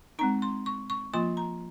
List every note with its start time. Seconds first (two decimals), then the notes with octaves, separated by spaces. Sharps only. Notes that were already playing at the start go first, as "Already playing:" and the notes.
0.19 G#3 C4 D#4 A#5
0.42 C6
0.66 C#6
0.90 C#6
1.14 F3 A#3 F4 C6
1.37 A#5